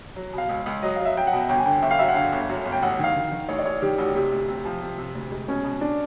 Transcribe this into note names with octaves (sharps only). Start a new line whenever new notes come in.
F#3
B2 F5
C#2
C#2
F#3 D#5
F5
F#3
E5
F#3 G5
F#5
B2
G1 G5
G#5
D3 G5
G1 E5
F5
F#2 E5
F#5
D3 F5
G1
F#2
G1
G5
A1 F#5
D#3 F5
D#3
D#3
A1 C#5
D5
A1 C#5
D#3 G4
A1 F#4
C3 G4
D2
C3
F3
C3
C3
D2
G#3
B2 C#4
B2
D4